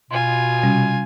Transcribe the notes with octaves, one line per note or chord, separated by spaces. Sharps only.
B2 F4 G#5 C6
C3 G3 C#4